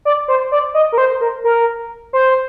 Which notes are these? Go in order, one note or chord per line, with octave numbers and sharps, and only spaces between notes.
D5
C5
D5
D#5
A#4
C5
A#4
A#4
C5